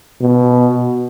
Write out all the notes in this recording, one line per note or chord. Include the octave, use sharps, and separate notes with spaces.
B2